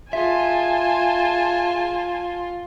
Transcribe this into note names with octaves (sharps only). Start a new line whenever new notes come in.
F4 G#4 E5 G#5 A5